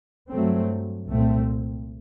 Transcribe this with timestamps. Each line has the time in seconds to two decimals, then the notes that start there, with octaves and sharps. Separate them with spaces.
0.31 G2 F#3 A3 C4
1.09 C2 A#2 A3 C4